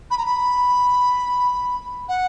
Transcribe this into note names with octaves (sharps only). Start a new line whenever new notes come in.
B5
A#5
B5
F#5